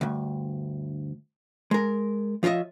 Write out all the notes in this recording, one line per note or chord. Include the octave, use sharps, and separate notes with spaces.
D2 G2
G#3 A#4
F3 F4 C#5 D#5 E5